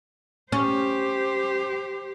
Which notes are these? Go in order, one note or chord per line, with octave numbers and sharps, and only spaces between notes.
C#4 G4 C5